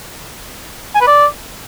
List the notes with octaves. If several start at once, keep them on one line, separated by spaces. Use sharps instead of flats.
G#5
B4
D5